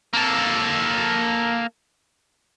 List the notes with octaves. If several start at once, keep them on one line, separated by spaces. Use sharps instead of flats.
A#3 A4